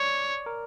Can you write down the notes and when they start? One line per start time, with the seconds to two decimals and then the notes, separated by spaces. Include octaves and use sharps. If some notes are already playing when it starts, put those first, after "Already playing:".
Already playing: C#5 D5
0.46 A#4